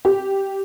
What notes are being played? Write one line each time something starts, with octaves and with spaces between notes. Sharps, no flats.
G4